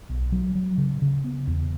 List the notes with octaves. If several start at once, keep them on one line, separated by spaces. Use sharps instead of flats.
B1
F#3
F#3
C#3
C#3
B3
E2